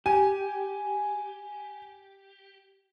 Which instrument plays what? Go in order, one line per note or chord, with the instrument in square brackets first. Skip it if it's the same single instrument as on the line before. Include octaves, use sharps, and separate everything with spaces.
[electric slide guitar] G4 [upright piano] G#5